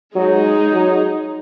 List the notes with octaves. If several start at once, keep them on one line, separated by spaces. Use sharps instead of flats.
F#3 G#3 D#4 G#4
F#3